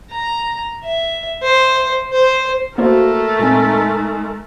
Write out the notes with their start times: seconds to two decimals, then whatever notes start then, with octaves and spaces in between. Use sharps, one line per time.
0.10 A#5
0.83 E5
1.42 C5
2.12 C5
2.78 A3 A#3 E4 F#4 A#4 C5
3.39 A#2 G#3 C4 D#4